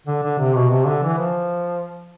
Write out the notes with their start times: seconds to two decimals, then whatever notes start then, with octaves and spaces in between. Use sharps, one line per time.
0.07 D3
0.23 D3
0.39 C3
0.55 B2
0.70 C3
0.87 D3
1.03 E3
1.18 F3